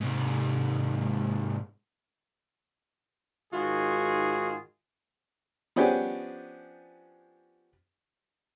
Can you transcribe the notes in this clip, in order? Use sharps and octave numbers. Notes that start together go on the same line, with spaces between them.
G#2 C3
G#2 D#3 F4 F#4 G#4
F3 B3 C#4 D4 G4 G#4